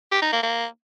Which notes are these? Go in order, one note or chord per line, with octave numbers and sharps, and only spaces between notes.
G4
D#4
A#3
A#3